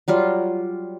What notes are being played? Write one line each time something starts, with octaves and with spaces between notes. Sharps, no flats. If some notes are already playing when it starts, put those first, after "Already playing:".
F#3 G3 F4